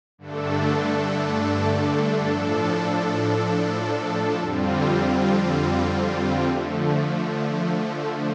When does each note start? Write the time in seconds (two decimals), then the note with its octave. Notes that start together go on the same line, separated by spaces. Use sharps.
0.18 G2 D3 A3 D4 A4
2.28 A2 F3 D4 A4
4.38 F2 D3 G3 C4 F4
6.47 D3 F3 A3